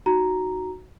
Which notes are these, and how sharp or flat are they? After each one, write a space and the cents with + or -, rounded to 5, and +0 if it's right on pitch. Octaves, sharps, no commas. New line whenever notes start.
D#4 +0 F#4 +0 A#5 +0